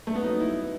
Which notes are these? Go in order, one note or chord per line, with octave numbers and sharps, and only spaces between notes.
G2 A3
B3
F#3 D#4
G3 E4